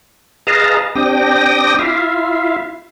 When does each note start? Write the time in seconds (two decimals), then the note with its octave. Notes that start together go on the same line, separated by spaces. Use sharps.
0.47 G#4 B4 D#5 F5 A5 A#5
0.95 C4 D4 G4 G5 D#6 A#6
1.79 E4 F4 E5 F5